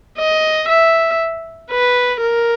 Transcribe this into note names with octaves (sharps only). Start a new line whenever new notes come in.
D#5
E5
B4
A#4